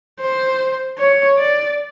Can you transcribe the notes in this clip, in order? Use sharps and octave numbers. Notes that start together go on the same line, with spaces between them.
C5
C#5
D5